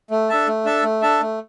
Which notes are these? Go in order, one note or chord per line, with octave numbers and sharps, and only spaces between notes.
A3
D4 A4 E5 A5
A3
D4 A4 E5 A5
A3
D4 A4 E5 A5
A3